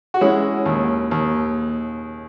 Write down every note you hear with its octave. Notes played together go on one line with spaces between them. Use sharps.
F#4
G#3 C#4 E4
D#2
D#2